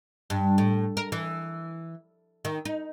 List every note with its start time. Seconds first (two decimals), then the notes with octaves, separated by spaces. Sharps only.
0.30 G2
0.58 A2
0.97 A#4
1.12 E3
2.45 D#3
2.65 D#4